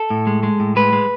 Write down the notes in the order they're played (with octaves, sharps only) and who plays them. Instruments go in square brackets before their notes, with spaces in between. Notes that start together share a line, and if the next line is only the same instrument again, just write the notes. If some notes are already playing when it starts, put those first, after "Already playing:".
Already playing: [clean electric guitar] A4
A2
G#3
G#3
A2
G#3 B4
G#3